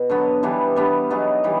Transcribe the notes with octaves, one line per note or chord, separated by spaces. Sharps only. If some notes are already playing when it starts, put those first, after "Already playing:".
Already playing: B2
D3 F#3 B3
E3 G3 B3 D4
G3 B3 D4
F#3 B3 D#4 G#4
E3 G3 B3